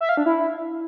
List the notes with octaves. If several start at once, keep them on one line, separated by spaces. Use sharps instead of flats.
E5
F5
D4
E4